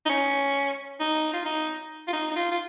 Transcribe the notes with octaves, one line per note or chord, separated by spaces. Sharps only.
D#4
C#4
D#4
F4
D#4
F4
D#4
D#4
F4
F4